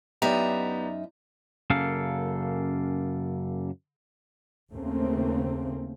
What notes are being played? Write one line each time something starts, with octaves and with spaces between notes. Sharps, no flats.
F#2 B3 D#4 G4 D5 E5 A#5
F#2 C#3 A#3 A4 F5
D#2 C#3 A3 A#3 C4